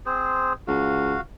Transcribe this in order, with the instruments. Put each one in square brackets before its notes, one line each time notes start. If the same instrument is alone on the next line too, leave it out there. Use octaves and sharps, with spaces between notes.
[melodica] C4 G#4 C5
[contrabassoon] C#2 [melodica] F#4 F5